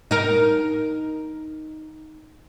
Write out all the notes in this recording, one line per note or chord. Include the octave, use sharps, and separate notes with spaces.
D#4 A#4